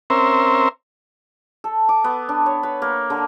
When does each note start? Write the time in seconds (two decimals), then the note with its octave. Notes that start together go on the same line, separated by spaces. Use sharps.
0.10 C4 C#4 A#4 C5 E5
1.64 A4
1.89 D6
2.04 B3
2.29 D4
2.46 C#5
2.63 B4
2.82 A#3
3.10 D3